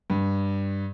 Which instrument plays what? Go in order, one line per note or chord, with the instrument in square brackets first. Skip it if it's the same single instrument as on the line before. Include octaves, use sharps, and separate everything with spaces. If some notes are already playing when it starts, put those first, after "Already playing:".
[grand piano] G2